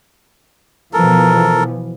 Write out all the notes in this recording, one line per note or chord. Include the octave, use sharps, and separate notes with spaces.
B2 E3 F3 A4 A#4